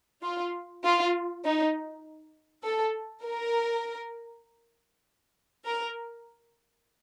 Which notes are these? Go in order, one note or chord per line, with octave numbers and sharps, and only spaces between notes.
F4
F4
D#4
A4
A#4
A#4